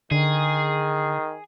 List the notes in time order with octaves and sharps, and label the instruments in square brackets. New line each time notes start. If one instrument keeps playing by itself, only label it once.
[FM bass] D3 [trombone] D#3 [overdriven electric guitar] G#4